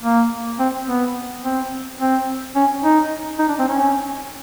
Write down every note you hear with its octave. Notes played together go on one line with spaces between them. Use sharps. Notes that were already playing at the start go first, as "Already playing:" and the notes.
A#3
C4
B3
C4
C4
C#4
D#4
D#4
D4
C4
C#4